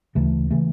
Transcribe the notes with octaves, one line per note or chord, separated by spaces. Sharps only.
D2 C#3 E3 A3
C#3 E3 A3